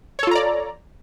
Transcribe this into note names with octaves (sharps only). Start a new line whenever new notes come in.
F4 A4 C#5 D5 A#5